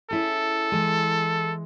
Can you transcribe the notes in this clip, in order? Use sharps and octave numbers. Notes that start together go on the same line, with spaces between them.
C#4 E4 G#4 A4
E3 G#3